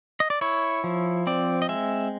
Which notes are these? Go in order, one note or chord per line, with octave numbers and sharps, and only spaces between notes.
D#5
D5
E4 C#5
F3
C4 D5
D#5
G#3 E5